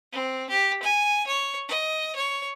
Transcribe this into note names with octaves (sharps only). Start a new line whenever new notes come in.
C4
G4
G#5
C#5
D#5
C#5